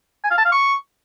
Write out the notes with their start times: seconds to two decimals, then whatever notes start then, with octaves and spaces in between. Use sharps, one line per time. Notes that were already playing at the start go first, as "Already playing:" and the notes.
0.24 G#5
0.31 F5
0.38 A5
0.45 F5
0.52 C#6